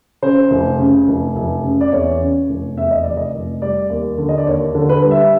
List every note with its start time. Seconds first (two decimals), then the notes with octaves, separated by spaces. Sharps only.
0.22 C#3 C5
0.51 F1
0.79 C#3
1.08 F1
1.36 F1
1.64 C#3
1.81 D5
1.92 E2 C#5
2.21 C#3
2.49 F1
2.77 E2 E5
2.91 D#5
3.04 F1 D5
3.17 D#5
3.34 F1
3.62 G3 D5
3.90 D#2
4.18 D3
4.29 D#5
4.38 D5
4.47 D#2 C#5
4.75 D3
4.89 B4
5.04 G3
5.11 E5